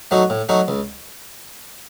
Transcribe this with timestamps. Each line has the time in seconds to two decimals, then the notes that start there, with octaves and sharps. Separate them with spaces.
0.11 F#3 A3 D#4 F#4
0.30 A2
0.49 F#3 A3 D#4 F#4
0.68 C#2